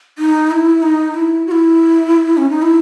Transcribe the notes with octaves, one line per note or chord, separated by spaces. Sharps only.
D#4
E4
D#4
E4
F#4
E4
C#4
D#4
E4